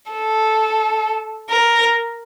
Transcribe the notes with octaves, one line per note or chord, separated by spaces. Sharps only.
A4
A#4